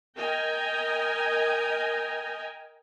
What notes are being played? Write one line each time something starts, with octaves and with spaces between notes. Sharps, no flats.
A#4 D#5 G5 G#5 A#5